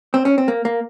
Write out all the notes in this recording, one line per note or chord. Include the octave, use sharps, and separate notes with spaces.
C4
C#4
C4
A#3
A#3